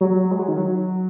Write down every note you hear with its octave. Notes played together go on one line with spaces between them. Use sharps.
F#3
G#3
F#3
D#3
F#3